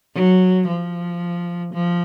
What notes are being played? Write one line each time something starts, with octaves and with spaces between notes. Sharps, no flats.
F#3
F3
F3